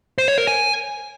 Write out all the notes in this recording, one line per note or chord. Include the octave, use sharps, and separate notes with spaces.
C5
C#5
A#4
G#5